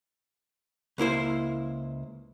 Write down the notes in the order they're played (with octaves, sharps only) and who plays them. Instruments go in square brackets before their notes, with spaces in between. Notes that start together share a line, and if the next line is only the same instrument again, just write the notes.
[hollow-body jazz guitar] C#2 A#3 E4 C5